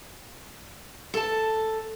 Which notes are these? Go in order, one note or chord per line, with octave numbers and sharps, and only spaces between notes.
A4 A5